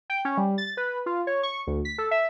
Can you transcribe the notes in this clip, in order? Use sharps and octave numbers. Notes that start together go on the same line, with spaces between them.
G5
C#4
G3
A6
B4
F4
C#5
C#6
D2
B6
A4
E5